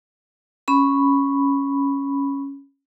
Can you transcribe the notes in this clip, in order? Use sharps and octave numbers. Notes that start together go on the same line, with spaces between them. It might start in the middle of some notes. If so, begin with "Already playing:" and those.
C#4 B5